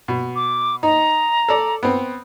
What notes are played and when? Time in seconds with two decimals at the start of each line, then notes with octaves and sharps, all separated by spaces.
0.08 B2
0.36 D6
0.83 D#4 A#5
1.48 A4 D5
1.83 B3 C4